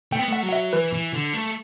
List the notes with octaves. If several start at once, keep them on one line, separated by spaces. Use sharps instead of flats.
A3 G5
B3
A3 F#5
F#3
F#5
E5
E3 B4
E3
D3
A3